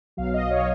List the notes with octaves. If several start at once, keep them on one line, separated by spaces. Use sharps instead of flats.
B1 B2 F#3 F5
D#5
C#5